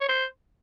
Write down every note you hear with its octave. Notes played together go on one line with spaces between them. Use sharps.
C#5
C5